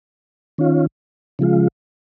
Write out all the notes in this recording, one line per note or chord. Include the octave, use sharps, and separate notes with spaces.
D#3 C#4 F4
C#3 F3 G#3 F4